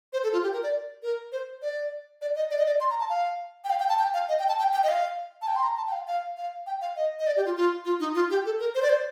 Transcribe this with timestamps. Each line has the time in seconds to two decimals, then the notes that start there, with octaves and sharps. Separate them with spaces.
0.13 C5
0.23 A4
0.33 F4
0.43 G4
0.53 A#4
0.63 D5
1.03 A#4
1.32 C5
1.62 D5
2.21 D5
2.36 D#5
2.51 D5
2.59 D#5
2.66 D5
2.80 C6
2.90 A#5
3.00 A5
3.09 F5
3.64 G5
3.70 F5
3.80 G5
3.89 A5
3.99 G5
4.14 F5
4.29 D#5
4.39 G5
4.49 A5
4.59 G5
4.73 G5
4.83 D#5
4.88 F5
5.42 A5
5.48 G5
5.56 C6
5.63 A#5
5.77 A5
5.87 G5
5.92 F5
6.07 F5
6.37 F5
6.66 G5
6.81 F5
6.96 D#5
7.19 D#5
7.27 D5
7.36 G4
7.46 F4
7.56 F4
7.85 F4
8.00 D#4
8.15 F4
8.30 G4
8.45 A4
8.60 A#4
8.75 C5
8.82 D5
8.89 C5